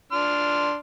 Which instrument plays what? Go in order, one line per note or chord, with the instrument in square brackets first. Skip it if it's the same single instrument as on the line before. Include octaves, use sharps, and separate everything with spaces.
[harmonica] D4 C6 F6